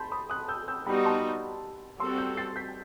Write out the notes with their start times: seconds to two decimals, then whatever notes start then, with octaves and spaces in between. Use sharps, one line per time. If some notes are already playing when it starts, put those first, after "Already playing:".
Already playing: A5 B5 C6 G6
0.12 B5 D#6
0.30 D#6 F#6
0.48 E6 G6
0.68 E6 G6
0.87 G3 B3 D#4 F#4 G5 B5
1.05 A5 C6
2.00 G3 C4 F#4 A4 C6 E6
2.18 E6 G6
2.37 A6 C7
2.56 G6 B6